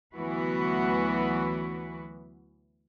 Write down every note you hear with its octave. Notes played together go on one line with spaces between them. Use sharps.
D2 E3 F#3 B3 F#4 B4